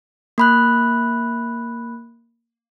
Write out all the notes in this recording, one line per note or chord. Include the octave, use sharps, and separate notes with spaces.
A#3 B5 F#6